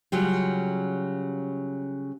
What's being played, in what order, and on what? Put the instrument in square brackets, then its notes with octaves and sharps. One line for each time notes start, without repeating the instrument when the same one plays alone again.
[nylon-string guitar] C#3 F#3 G3 F4